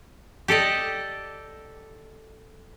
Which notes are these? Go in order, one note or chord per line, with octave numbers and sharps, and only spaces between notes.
G4 A4 D5 D#5